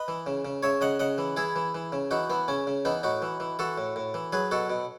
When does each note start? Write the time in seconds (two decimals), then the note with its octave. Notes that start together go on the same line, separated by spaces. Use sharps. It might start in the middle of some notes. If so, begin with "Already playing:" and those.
Already playing: B4 D#5
0.08 E3
0.26 C#3
0.45 C#3
0.63 C#3 C#5 E5
0.81 C#3 D#5 F#5
0.99 C#3 D#5 F#5
1.18 E3
1.37 E3 E4 G#4
1.56 E3
1.75 E3
1.92 C#3
2.11 E3 D#4 F#4
2.30 E3 B3
2.48 C#3 C#4
2.67 C#3
2.85 E3 B3 D#4
3.03 A2 D#4 F#4
3.22 E3
3.40 E3
3.59 E3 F#4 A4
3.78 A2
3.96 A2
4.14 E3
4.33 F#3 G#4 B4
4.51 B2 F#4 A4
4.70 B2